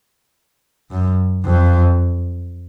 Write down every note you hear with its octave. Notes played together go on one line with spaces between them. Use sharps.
F#2
F2